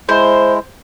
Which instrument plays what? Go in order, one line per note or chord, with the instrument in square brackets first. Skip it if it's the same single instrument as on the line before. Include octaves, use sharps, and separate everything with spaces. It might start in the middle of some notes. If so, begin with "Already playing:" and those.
[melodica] G#3 E4 [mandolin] C5